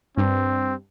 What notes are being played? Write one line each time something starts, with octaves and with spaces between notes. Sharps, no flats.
G2 C4